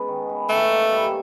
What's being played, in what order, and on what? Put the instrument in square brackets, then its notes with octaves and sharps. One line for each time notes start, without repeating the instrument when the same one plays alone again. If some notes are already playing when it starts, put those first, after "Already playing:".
Already playing: [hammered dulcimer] G#3 B3 C#4
D#3
B3
[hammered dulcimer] D#3 [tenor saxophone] A3
[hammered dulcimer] A#3
G3